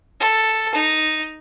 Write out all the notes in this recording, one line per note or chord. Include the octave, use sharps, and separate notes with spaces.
A4
D#4